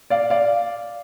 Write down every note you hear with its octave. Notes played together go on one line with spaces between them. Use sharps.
D5 F5
D5 F5